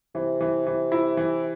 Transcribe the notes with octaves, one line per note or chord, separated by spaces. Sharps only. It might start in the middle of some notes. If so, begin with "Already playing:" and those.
C3 E3
E3
E3
E4
E3